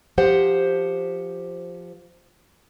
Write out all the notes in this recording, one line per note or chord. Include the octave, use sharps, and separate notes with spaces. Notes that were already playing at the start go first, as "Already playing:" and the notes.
F3 G4 C5 F#5